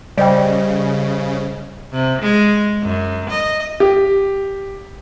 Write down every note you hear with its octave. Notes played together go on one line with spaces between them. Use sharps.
C#3 G3 C5 D5 D#5 G5
C3
G#3
F#2
D#5
G4